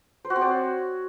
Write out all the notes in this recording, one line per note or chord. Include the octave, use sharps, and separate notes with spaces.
C5
F#4
C4
D5
C#5